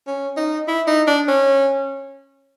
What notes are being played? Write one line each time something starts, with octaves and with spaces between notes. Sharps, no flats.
C#4
D#4
E4
D#4
D4
C#4